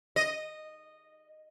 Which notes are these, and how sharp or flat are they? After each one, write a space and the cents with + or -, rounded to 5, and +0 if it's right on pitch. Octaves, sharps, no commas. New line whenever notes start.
D#5 -10